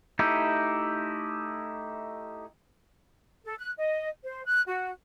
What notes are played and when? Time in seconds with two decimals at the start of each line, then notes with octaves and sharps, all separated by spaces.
0.19 A3 D#4 E4 G4
3.45 A4
3.59 F#6
3.78 D#5
4.24 C5
4.46 F#6
4.67 F#4